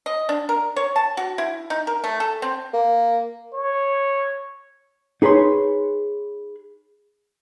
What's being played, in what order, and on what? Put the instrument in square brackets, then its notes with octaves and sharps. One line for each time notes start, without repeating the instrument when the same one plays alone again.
[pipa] D#5
D4
A#4
C#5
A5
F#4
E4
D#4
A#4
A3
A4
C4
[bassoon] A#3
[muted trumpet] C#5
[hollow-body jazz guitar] D#4 G#4 B4 C#5 C6